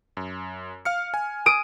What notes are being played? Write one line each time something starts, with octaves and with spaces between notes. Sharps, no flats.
F#2
F5 F6 C#7
G#5
D#6 D7